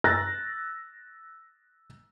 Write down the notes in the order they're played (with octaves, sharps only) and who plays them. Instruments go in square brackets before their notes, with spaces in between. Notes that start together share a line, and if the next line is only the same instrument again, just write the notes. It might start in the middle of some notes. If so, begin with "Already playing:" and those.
[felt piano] E6 F#6 A6 A#6